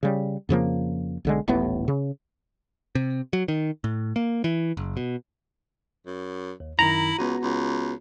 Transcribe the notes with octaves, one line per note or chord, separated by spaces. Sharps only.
C#3 G3
F2 C#3 F3 A#3
B1 D3 G#3
D#1 A1 A2 B3
C#3
C3
F#3
D#3
A2
A#3
E3
F#1
B2
F#2
D#2
F#2 D#3 E4 A#5
C#2 B3 F#4
C#2